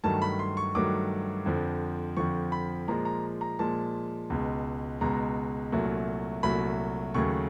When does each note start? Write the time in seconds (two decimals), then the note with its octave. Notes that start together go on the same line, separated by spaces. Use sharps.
0.04 G2 D#3 F#3 A3 A5
0.22 B5
0.39 C6
0.57 C#6
0.75 G2 D#3 F#3 A3 D6
1.46 F2 D3 F3
2.17 F2 D3 F3 C#6
2.52 B5
2.88 A#2 F3 G#3 A#5
3.05 A#5
3.41 A#5
3.59 A#2 F3 G#3 A5
4.30 C#2 B2 G#3
5.01 C#2 B2 G#3 A#5
5.72 C2 A#2 F#3 A3
6.43 C2 A#2 F#3 A3 B5
7.14 D#2 C#3 F#3 A3 C#6